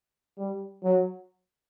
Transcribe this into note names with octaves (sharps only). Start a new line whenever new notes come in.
G3
F#3